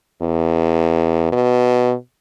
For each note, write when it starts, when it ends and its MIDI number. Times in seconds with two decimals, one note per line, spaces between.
0.22 1.28 40
1.32 1.93 47